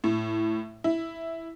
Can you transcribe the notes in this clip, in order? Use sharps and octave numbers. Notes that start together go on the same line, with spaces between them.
A2
E4